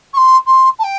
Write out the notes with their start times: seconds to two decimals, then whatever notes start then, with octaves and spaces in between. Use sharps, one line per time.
0.13 C#6
0.17 C6
0.46 C6
0.79 A5
0.84 G5